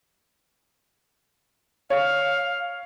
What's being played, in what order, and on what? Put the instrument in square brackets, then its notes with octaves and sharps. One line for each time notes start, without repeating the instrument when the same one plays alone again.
[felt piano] C#5 [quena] F5